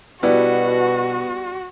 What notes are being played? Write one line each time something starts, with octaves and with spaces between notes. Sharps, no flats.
B2 G3 B3 D4 E4 F#4